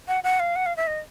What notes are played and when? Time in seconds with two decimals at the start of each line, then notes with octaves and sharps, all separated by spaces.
0.08 F#5
0.24 F#5
0.40 F5
0.56 F#5
0.66 F5
0.77 E5
0.87 D#5